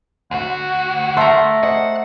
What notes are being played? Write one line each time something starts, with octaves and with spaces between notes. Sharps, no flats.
D2 F#4 F#5
A3 A#4 C6
C5 D#5 F#5